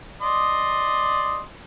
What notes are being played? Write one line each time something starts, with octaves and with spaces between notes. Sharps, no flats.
D5 D#5 C6